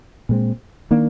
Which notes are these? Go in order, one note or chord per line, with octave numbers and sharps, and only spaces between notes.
A#2 G#3 C4
D#3 A#3 D4